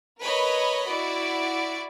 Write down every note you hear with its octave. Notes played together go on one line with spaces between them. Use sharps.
A#4 B4 C#5 D#5 B5
E4 F#4 D5